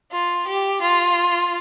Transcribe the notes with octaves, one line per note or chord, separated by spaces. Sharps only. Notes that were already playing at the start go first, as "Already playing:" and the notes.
F4
G4
F4